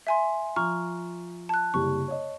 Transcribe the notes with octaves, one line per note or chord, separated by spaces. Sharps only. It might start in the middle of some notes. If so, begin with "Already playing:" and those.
E5 G#5 C6
F3 A#5 C#6 F6
A5 F#6
F#1 C3 G3 C#6
C#5 D#5